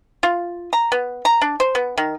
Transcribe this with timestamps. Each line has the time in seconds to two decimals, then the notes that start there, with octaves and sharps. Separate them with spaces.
0.23 F4
0.73 A#5
0.92 B3
1.25 A#5
1.41 D4
1.60 C5
1.75 B3
1.98 D#3